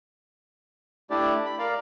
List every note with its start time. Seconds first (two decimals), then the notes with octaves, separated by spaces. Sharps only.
1.11 A3 D4 E4 G4 D5
1.46 B5
1.59 A#4 D5 F5